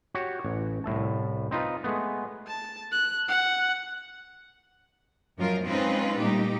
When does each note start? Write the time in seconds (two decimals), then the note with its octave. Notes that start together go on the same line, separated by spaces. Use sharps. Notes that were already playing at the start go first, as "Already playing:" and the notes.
0.14 F#4 G4 C#5
0.45 A1
0.84 C2 A2 E5 A5
1.51 C4 D#4 F4 B4
1.84 G#3 A3 B3
2.47 A5
2.92 F#6
3.28 F#5
5.37 F#2 F3 F#3 G#3 F4 A#4
5.67 G#3 C4 C#4 D#4 F4 B4
6.18 A#2 G3 A3 D#4 G4